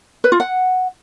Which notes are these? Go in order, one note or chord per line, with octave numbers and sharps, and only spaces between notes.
B4
F4
F#5